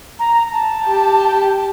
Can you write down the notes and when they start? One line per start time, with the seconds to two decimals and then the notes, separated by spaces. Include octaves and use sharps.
0.19 A#5
0.52 A5
0.85 G4